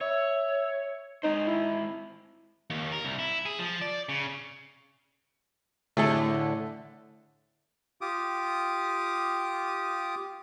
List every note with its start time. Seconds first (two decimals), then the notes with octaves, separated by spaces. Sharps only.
0.01 C#5 E5
1.23 G#3 C4 D#4 C5
1.47 E4
2.70 D#2
2.92 A#4
3.05 C2
3.19 E4
3.46 G#4
3.59 F3
3.82 D5
4.09 C#3
5.97 A2 D3 A3 G#4 A4
8.01 F4 G4 D6 D#6